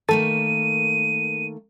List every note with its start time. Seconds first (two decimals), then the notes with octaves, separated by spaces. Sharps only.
0.09 D#3 A3 A#3 A4 A6 D#7